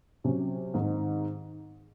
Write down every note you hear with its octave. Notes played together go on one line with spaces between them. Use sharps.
C3 F#3 C#4
G#2 D#3 G#3 C4 D#4